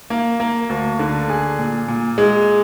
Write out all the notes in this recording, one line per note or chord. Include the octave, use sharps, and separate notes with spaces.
A#3
A#3
D2
D3
G#4
A#2
A#2
G#3